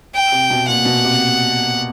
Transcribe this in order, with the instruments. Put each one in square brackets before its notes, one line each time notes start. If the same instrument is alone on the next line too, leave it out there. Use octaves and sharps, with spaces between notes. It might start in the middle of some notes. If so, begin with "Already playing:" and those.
[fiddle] G5
[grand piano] C3
B2
[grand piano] A#2 [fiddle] F#5
[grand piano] B2
C3